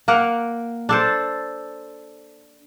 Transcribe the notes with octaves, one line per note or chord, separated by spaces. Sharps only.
A#3 A#4 F#5
D4 A4 C5